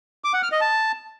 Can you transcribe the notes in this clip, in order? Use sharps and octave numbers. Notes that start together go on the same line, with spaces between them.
D6
F#5
F6
D#5
A5